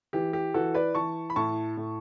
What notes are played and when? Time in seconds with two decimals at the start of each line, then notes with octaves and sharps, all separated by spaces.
0.13 E3 G4
0.33 G4
0.54 E3 F#4 A4
0.74 B4 D5
0.95 E3 A5 C#6
1.30 B5
1.36 A2 A5 C#6
1.77 A2